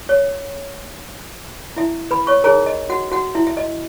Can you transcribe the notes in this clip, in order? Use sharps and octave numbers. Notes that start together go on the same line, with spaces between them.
C#5
E4 E5
B4 B5
C#5 C#6
D#4 G#4 A#4 C#5 A#5
D#5
F#4 F#5
F#4 F#5
E4 E5
E5
D#5